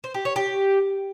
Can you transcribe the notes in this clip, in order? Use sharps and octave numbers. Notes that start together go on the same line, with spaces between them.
C5
G4
C#5
G4